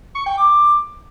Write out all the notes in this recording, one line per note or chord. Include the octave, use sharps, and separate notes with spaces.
C#6
G5
D6